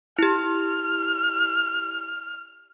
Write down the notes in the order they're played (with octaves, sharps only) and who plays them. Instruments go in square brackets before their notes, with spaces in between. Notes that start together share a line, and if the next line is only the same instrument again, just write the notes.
[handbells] E4 G4 [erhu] F6